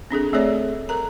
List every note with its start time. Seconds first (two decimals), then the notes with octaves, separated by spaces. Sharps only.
0.11 C4 D4 G#4 A4
0.33 A3 C4 G#4 A4 C#5 D5
0.89 A4 A#4 A#5